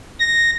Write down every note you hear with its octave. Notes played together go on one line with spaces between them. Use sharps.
A#6